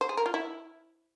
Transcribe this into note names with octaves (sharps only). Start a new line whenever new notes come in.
C5
G#4
A#4
F4
E4